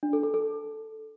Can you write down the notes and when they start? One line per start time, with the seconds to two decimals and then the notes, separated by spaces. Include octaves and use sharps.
0.03 D4
0.13 A4
0.23 A4
0.34 A4